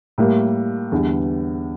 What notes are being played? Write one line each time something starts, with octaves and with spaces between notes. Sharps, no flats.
A2 G3 A#3
E2 D3 G3